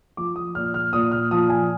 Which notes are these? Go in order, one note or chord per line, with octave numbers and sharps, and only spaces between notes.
F3 D6
D#6
A#2 F6
F6
A#2 D#6
F6
F3 D#6
G#5